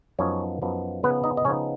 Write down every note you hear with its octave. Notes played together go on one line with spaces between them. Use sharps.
F#2 F3 B3 C#4 D#4 C#5
F#2 F3 B3 D#4
C#3 F3 B3 D#4 B4
D#4 D#5
D#5
C#3 F3 B3 C#4 D#4 C#5